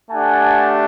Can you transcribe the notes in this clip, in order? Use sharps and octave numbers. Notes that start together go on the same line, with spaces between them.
A3 D4 G4 F#5 G#5